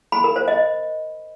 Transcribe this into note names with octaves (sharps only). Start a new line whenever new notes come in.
B5
A#4
C5
D#5